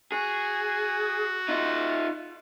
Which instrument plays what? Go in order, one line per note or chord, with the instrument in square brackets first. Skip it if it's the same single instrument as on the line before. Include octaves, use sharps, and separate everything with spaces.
[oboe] F#4 [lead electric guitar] G#4
[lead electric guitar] D#4 F4